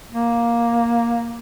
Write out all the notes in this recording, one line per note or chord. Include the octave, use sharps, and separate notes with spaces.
A#3